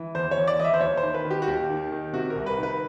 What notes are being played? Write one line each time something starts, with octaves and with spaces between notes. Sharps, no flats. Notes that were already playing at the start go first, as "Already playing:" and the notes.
Already playing: E3
E2 C5
C#5
E2
D5
E3 D#5
E5
C5
D#2 C#5
C5
D#3
B4
D#3
G4
F#4
D#2 G4
D#3
D#3
C3 F#4
A#4
C2
B4
D#3 B4